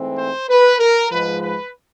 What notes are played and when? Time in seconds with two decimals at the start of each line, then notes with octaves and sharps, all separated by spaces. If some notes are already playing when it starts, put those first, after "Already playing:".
Already playing: G#2 E3 A3 C4
0.18 C5
0.49 B4
0.79 A#4
1.10 G#2 F3 G#3 B4
1.42 B4